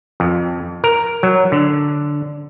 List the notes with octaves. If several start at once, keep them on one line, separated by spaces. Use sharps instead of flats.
F2
A#4
F#3
D3